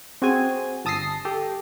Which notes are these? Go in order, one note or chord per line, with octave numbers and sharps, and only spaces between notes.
C4 F#4 G#4 G#5
G1 A5 D#6 E6 A#6 C7
G4 A4